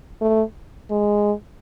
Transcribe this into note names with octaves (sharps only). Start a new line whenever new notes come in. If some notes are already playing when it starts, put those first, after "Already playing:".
A3
G#3